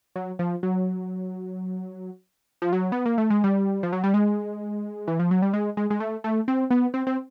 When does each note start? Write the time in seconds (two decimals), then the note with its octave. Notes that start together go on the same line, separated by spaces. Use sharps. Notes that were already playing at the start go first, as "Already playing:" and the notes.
0.16 F#3
0.39 F3
0.63 F#3
2.62 F3
2.73 F#3
2.92 B3
3.06 A#3
3.18 A3
3.30 G#3
3.44 G3
3.83 F3
3.93 F#3
4.04 G3
4.14 G#3
5.08 E3
5.19 F3
5.31 F#3
5.42 G3
5.53 G#3
5.77 G#3
5.90 G#3
6.00 A3
6.24 A3
6.48 C4
6.71 B3
6.94 C4
7.07 C4